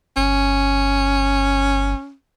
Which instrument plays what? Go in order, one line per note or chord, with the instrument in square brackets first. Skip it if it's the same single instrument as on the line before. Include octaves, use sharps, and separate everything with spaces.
[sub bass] G1 [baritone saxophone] C#4